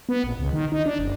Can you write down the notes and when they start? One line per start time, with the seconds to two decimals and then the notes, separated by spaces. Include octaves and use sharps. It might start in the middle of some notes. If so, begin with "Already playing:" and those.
0.09 B3
0.24 A#1
0.39 C#2
0.53 D#3
0.72 D#4
0.86 D4
0.99 F#1